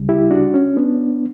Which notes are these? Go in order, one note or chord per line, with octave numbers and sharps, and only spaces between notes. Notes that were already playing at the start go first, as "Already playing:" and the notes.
Already playing: D2 C#3 G3
E4 G4
D4 F#4
C#4
B3 D4